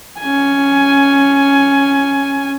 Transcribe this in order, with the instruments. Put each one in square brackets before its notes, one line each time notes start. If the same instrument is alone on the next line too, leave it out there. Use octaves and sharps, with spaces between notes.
[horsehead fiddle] C#4 G#5